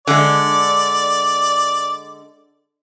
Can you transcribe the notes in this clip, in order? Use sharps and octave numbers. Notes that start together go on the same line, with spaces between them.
D3 G#3 D5